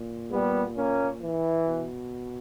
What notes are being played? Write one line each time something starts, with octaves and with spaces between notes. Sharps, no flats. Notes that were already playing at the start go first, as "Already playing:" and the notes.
Already playing: A#2
G3 B3
A#3 C#4
E3
B2